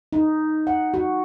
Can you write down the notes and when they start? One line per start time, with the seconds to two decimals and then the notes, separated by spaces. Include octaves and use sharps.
0.13 D#4
0.67 F#5
0.94 F#4